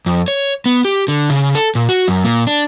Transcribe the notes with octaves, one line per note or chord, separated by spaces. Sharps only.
F2
C#5
B3
G4
D3
C#3
A4
A#2
F#4
F#2
A#2
D4